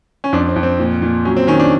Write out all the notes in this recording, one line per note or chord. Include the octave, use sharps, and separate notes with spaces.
C#4
F2 D4
C4
F2
C4
A#2
A#2
F#3 C#4
C4
D#3 C#4
D4